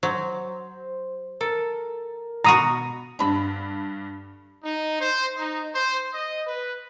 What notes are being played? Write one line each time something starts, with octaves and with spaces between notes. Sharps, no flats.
F#3 C5
A4 A#4
B2 B3 F#4 A#5 D#6
G2 D3 D4 B5
D#4
C5
D#4
C5
D#5
B4